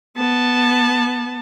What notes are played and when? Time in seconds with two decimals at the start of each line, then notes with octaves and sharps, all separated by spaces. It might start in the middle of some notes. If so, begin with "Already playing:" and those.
0.17 B3 A5